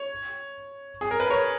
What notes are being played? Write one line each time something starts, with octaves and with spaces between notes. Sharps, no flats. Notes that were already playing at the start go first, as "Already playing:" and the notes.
Already playing: C#5
G#4
A#4
B4
A#4 C#5